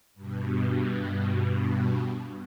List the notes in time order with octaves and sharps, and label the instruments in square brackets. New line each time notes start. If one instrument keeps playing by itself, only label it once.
[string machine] G2 B2